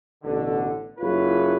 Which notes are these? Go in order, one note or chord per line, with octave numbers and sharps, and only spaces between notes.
A1 B2 D3
F#1 E4 F4 B4 C#5